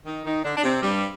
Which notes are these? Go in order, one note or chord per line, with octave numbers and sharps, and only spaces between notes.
D#3 D#4
D#3 D#4
D3 D4
D4
C3 C4
G2 G3